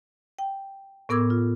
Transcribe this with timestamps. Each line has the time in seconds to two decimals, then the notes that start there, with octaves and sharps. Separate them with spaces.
0.39 G5
1.09 A2 B3 A#4 D6 E6 G#6
1.30 F4